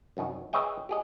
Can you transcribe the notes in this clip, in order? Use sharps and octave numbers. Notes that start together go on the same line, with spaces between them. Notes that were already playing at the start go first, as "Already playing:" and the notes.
C2 F#2 D#3 F#3
G#4 B4 C#5 D#5 E5 G5
G4 G#4 D#5